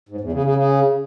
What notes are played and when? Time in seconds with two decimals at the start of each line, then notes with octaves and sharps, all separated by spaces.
0.09 G#2
0.21 E2
0.32 C#3
0.44 C#3
0.56 C#3